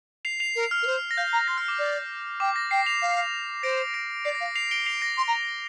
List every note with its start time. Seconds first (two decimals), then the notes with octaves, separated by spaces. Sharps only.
0.25 C7 F7
0.40 C7 F7
0.55 A#4
0.71 F6
0.82 A#4
0.86 C5
1.11 A#6
1.17 F5 G6
1.32 A#5
1.48 C6 A#6
1.58 F6
1.68 D6
1.79 D5 F6
2.40 G5 D6
2.56 A#6
2.71 G5 C7
2.86 C7 F7
3.02 F5
3.63 C5 A#6 D7
3.94 A#6 D7
4.25 D5 C7
4.35 A#6
4.40 F5
4.46 A#6
4.55 C7 F7
4.71 D7 G7
4.86 C7 F7
5.02 A#6 D7
5.17 C6
5.27 A#5